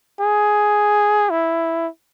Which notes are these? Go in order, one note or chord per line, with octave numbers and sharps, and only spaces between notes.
G#4
E4